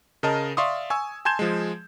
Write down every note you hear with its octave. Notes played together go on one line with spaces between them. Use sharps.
C#3 A#4 D#5 A5
D5 E5 F5 C6 C#6 D#6
G#5 C#6 E6
G#5 A5 C6 G6 G#6 E7
F3 G#3